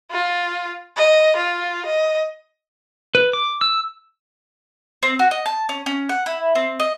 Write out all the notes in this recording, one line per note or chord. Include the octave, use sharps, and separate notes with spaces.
F4
D#5
F4
D#5
B4
D6
E6
C4
F#4
D#5
A5
C#4
C#4
F#5
E4
C4
D#5